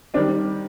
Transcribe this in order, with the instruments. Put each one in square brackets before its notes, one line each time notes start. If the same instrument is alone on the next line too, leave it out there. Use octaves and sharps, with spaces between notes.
[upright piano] D#3 G3 [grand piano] C4 D4